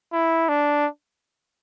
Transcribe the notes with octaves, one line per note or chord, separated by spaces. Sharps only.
E4
D4